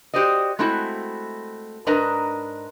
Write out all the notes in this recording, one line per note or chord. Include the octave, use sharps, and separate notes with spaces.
F#4 G4 C5 D5 D#5
G#3 A3 C4 E4 F#4
G#2 D4 A#4 B4 D#5 A#5